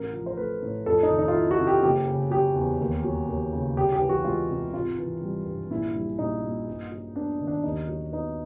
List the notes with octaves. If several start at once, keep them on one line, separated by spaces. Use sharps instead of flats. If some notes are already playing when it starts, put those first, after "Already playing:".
Already playing: A1 A#4
F3
C5
A3 B4
A2
F2 A4
D#4
D#3
D#4
F4
F#3 E4
F#4
C3
G4
F#1 G4
C#3
F#3 G4
E2
D#2
F#3
D#2
C#3
C2 G4
G4
E3
F#4
G#3 F4
C3
G#1 F4
E3
G3
G2
A#1 E4
G3
A#1 D#4
A#2
G2
F#3
B3 D4
D#3
D4
D#2 D#4
F#3
B3 D#4